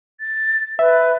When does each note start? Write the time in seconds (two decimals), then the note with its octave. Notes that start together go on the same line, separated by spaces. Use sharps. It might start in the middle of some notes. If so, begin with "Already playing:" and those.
0.21 A6
0.79 B4 E5